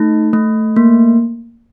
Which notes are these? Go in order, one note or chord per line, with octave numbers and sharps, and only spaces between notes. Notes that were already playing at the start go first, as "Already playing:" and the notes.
Already playing: A3 D#4
A3
A#3